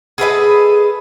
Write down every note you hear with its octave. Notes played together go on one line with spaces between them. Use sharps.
G#4 A4 B4 D#5